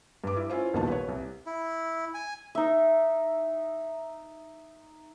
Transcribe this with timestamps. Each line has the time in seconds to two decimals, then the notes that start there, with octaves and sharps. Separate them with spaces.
0.24 G2 D6
0.37 E4
0.50 C#4 E4 F4 C5
0.73 D#1 A#1 B2 A#3 D#4 A5
0.88 B4 C#5
1.08 C2
1.46 E4
2.14 G#5
2.55 D#4 E5